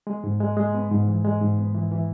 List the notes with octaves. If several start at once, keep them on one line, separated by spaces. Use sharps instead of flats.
G#3
G#2
G#3
G#3
B3
G#2
E3
G#3
G#2
B3
E3
E3